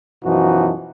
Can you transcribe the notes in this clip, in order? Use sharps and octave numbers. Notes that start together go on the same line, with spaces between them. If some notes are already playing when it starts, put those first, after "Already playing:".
F#2 B2 E3 F3 D#4 F#4